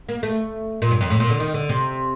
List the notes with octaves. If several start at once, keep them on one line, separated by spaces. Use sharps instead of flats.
A#3
A3
A#2
G2
F2
A2
A#2
D3
D#3
D3
C3